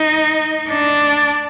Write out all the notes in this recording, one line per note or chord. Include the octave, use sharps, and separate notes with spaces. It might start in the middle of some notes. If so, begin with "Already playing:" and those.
Already playing: D#4
D4